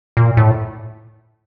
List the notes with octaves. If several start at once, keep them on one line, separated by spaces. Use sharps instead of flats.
A#2
A2